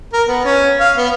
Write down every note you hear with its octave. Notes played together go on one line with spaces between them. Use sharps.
A#4
B3
C#4
F5
B3